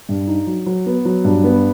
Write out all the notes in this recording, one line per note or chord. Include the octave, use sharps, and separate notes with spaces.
G2
D#4
F#3
F#3
B3
F#3
G2
B3